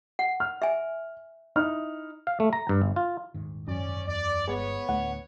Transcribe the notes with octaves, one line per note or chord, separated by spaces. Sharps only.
F#5
F6
E5 G#5
D#4 E4 F6
F5
A3
A#5
G2
G1
F4
D#1 G#2 D#3
F#2 C#4 D5
E2 D5
G1 G#3 B3 C#5
D2 A2 F#5